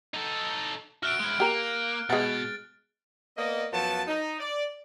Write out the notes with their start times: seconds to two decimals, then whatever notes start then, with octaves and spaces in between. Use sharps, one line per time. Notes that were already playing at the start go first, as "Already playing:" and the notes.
0.14 D#4 A4
1.03 F#4 E5 F6 F#6 D7
1.20 G#3 E4
1.40 A#3 G4 A#4
2.10 B2 G#3 B3 A6
3.37 A#3 B3 D5 D#5
3.73 F#2 F3 F#3 B3 A5
4.08 D#4
4.40 D5